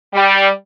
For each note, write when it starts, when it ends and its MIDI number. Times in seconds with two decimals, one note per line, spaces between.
0.14 0.48 55